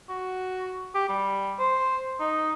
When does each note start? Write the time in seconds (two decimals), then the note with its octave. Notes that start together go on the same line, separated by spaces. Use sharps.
0.09 F#4
0.95 G4
1.09 G3
1.59 C5
2.20 D#4